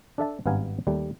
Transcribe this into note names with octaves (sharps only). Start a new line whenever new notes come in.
D4 A4 E5 A5
G#1 G2 B3 F5 G#5 A#5
D#2 G3 A3